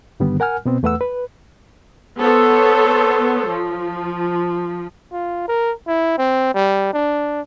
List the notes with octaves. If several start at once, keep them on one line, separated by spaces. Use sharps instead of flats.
G2 D3 D#3 G3 B3
A#4 F#5 G#5 F6
B2 B3 C4
E2 A3 B4 F#5 E6
B4
B3 A4 C5 C#5
F3
F4
A#4
E4
C4
G3
D4